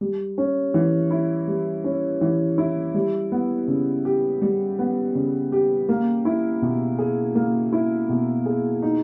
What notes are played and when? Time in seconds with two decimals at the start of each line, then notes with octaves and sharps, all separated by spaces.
0.01 G3
0.38 C#4
0.74 E3
1.11 E4
1.48 G3
1.84 C#4
2.21 E3
2.58 E4
2.94 G3
3.32 B3
3.68 C#3
4.05 G4
4.42 G3
4.79 B3
5.15 C#3
5.52 G4
5.89 A#3
6.25 E4
6.62 B2
6.99 G#4
7.35 A#3
7.72 E4
8.09 B2
8.46 G#4
8.82 D#4